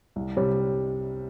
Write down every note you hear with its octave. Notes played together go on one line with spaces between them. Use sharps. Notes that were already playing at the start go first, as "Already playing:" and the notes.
C2
C3 G3